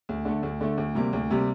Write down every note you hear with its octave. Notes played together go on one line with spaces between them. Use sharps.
D2
D3 A3
D2
D3 A3
D2
C3 G3 A#3
D2
C3 G3 A#3